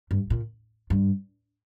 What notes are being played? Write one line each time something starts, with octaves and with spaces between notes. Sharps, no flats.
G2
A#2
G2